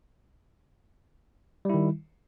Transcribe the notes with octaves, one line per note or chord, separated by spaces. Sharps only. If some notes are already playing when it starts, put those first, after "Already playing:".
D#3 G3 E4